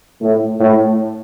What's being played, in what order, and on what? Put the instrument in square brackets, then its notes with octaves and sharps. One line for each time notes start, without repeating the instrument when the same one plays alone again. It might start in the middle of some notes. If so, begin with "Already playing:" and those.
[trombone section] A2
A2